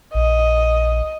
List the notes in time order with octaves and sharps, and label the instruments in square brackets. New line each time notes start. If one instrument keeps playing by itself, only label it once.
[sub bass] A#1 [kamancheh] D#5